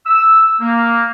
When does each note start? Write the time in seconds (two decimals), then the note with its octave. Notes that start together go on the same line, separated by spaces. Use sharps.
0.06 E6
0.60 A#3